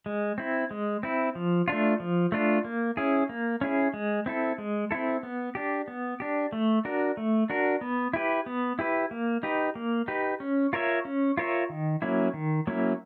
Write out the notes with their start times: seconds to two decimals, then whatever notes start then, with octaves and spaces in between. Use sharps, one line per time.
0.06 G#3
0.38 C4 E4
0.71 G#3
1.03 C4 E4
1.35 F3
1.68 A3 D4 F4
2.00 F3
2.32 A3 D4 F4
2.65 A#3
2.97 C#4 E4 G#4
3.29 A#3
3.61 C#4 E4 G#4
3.94 G#3
4.26 C4 E4 A4
4.58 G#3
4.91 C4 E4 A4
5.23 B3
5.55 D4 G4
5.88 B3
6.20 D4 G4
6.52 A3
6.85 D4 F#4 A#4
7.17 A3
7.50 D4 F#4 A#4
7.81 B3
8.13 E4 G4 B4
8.46 B3
8.79 E4 G4 B4
9.11 A#3
9.43 D#4 G4 B4
9.75 A#3
10.08 D#4 G4 B4
10.40 C#4
10.73 F4 A#4 C#5 E5
11.05 C#4
11.37 F4 A#4 C#5 E5
11.70 D#3
12.02 F#3 A#3 C#4 E4
12.34 D#3
12.67 F#3 A#3 C#4 E4